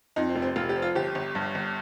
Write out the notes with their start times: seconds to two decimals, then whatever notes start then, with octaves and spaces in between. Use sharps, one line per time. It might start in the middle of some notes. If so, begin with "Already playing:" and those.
0.16 F2 D#4
0.29 C4
0.36 F1
0.42 C4
0.56 F1 F4
0.69 G4
0.76 F3
0.82 F4
0.95 G1 G4
1.15 G1
1.35 G2
1.55 G1